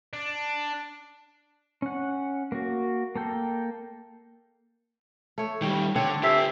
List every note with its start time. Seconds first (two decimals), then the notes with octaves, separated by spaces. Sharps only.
0.13 D4
1.82 C#4 F#5
2.52 A#3 F#4
3.16 A#3 A4 G5
5.38 A3 C#5
5.62 D#3 G3 G5
5.96 D3 C4 D4 C#5
6.23 G4 A4 C5 E5